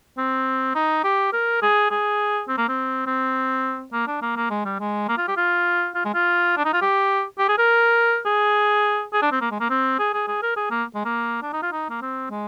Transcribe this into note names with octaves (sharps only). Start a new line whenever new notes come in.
C4
D#4
G4
A#4
G#4
G#4
C4
A#3
C4
C4
A#3
D4
A#3
A#3
G#3
G3
G#3
A#3
F4
G4
F4
F4
G#3
F4
D4
D#4
F4
G4
G4
G#4
A#4
G#4
G#4
D4
C4
A#3
G#3
A#3
C4
G#4
G#4
G#4
A#4
G#4
A#3
G#3
A#3
D4
D#4
F4
D#4
A#3
C4
G#3